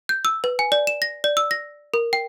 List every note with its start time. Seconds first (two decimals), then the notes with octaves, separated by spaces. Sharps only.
0.09 G6
0.25 E6
0.44 B4
0.59 G#5
0.72 D5
0.87 E7
1.02 A#6
1.24 D5
1.37 E6
1.51 A#6
1.94 A#4
2.13 G5